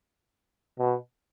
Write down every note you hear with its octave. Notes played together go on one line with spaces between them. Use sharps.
B2